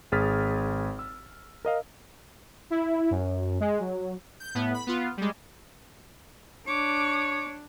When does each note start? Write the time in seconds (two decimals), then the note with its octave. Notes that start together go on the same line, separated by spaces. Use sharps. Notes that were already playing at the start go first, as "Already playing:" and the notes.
0.12 G#1 G#4 D#6 F6 A6 B6
0.99 E6
1.65 A#4 D#5 F5
2.70 E4
3.11 F#2
3.60 G#3
3.80 F#3
4.40 G6
4.55 A2 B3
4.74 B5
4.87 B3 F4
5.17 G3 G#3
6.68 D4 C#5 D6